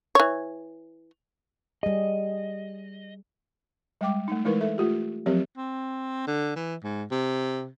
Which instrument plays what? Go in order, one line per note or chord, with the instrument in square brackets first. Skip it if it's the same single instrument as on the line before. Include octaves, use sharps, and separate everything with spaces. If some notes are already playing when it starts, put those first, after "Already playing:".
[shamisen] E3 C#5
[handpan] G3 G#4 [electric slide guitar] D#5
[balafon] G3 G#3 G5 D6
A3 D#4
E3 G#3 D#4 E4 A#4 B4
A4 E5
A3 F4 G4
F3 F#3 C4 G4 A#4 C#5
[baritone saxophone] C4
D3
E3
G#2
C3